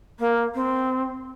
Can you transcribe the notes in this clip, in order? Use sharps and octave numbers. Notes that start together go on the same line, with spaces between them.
A#3
C4